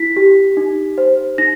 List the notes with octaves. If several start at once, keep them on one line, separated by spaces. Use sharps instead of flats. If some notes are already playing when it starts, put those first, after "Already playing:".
Already playing: E4 B6
G4
D#4
C5
D#4 A#6